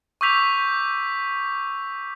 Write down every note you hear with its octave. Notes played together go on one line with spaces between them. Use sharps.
C#6 D6 E6 G6 B6 F7